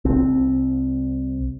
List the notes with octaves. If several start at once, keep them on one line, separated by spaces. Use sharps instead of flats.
C2 C4